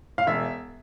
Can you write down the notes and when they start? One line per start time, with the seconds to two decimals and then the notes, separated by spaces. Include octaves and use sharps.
0.18 F5
0.27 E1 E5